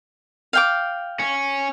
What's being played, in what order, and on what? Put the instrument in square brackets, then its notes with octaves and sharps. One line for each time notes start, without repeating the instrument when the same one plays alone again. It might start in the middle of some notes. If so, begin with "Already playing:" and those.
[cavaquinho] F5 G5 D6
[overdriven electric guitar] C#4